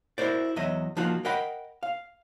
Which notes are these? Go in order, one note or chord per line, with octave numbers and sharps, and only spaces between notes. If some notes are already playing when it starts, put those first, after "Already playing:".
E4 F#4 A#4 C5 D5
E2 F#3 D#5 E5
F3 A#3 D#4 F4 F#4
A#4 D#5 F#5 G5 B5
F5